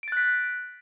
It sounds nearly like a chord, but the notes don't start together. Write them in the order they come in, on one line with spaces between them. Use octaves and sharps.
D7 A6 F#6 B6